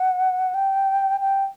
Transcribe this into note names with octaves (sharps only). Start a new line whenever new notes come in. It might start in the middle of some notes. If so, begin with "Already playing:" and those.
Already playing: F#5
G5
G5